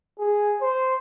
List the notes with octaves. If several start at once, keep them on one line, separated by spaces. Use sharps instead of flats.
G#4
C5